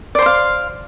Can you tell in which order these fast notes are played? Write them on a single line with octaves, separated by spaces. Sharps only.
D5 C5 C6 F5